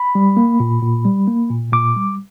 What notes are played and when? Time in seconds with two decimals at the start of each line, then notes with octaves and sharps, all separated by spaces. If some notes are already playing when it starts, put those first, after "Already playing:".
Already playing: B5
0.15 G3
0.37 A#3
0.60 A#2
0.83 A#2
1.05 G3
1.28 A#3
1.50 A#2
1.73 A#2 D6
1.96 G3